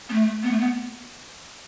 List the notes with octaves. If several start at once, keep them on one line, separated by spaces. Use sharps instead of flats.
B3
A3
B3
A3
B3